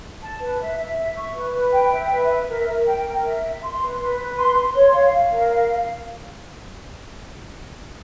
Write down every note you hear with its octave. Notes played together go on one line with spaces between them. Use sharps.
A5
B4
E5
E5
E5
C#6
B4
B4
G5
E5
B4
E5
A#4
A#4
G5
A#4
E5
E5
C6
B4
B4
B4
C6
C6
C#5
F5
F5
A#4
F5
F5